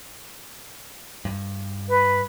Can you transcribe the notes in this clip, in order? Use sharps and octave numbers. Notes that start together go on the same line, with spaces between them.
G2
B4